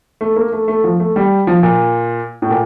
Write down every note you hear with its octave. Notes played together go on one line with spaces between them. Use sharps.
A3
A#3
A3
A3
F3
A3
G3
F3
A#2
A2
A#2